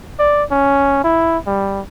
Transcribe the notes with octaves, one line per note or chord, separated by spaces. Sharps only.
D5
C#4
E4
G3